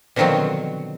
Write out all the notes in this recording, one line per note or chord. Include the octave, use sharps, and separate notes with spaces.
B2 D3 D#3 F3 F#3 C4